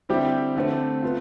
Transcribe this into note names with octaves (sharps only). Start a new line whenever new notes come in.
D3 G3 C4 E4 G4
D3 A3 C4
B3 F4